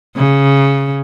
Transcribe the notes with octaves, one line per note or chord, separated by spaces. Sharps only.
C#3